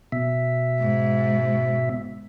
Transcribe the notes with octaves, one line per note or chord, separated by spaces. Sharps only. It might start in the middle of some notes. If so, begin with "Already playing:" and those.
B2 E5
G#2